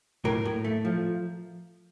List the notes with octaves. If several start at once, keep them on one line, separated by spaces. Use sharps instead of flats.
A2 A#4
A2
A3
F3